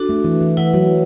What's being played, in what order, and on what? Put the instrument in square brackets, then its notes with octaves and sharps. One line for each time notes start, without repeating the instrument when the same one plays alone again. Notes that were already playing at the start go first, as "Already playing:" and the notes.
Already playing: [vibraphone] D4 F#4 A4
[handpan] A3
E3
E3
[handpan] E3 [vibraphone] E4 B4 F#5
[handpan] F#3